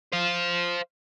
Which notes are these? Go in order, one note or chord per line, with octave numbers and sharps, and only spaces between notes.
C5 F5